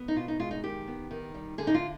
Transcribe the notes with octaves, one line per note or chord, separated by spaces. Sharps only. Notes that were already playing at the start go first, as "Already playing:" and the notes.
Already playing: B3
D#4
B2 F4
D#4
G#3 F4
D#4
D#3 G4
B3
D#3
G3
D3 G#4
D#4
F4